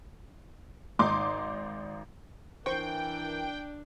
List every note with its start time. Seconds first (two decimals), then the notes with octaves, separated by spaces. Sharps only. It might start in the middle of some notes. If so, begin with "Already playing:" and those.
0.99 G#1 D#4 C6 D6
2.66 E3 D4 A#4 C5 G5 C#6